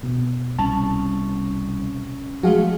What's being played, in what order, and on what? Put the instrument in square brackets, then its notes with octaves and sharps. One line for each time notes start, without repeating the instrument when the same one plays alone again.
[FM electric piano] B2
[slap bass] C2 [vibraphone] C#4 [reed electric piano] A5
[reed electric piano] F3 G#3 [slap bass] F#3 A3 [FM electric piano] F#4 G#4 F5